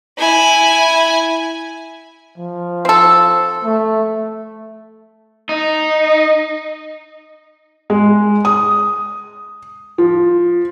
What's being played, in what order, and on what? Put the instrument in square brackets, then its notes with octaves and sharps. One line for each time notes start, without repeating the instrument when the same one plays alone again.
[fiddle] E4 G#5
[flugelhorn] F3
[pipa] C4 A4
[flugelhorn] A3
[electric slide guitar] D#4
[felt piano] G#3
D#6
F3